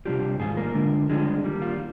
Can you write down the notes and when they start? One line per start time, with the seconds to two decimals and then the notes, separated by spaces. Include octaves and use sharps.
0.05 C3 G3 D4 F4 G4
0.40 G#2 D#3 G#3 F4 G#4
0.57 A#3 A#4
0.75 D3 G#3 D4 F4
1.09 D3 G3 G#3 D4 F4 G#4
1.44 D#3 G3 A#3
1.62 F4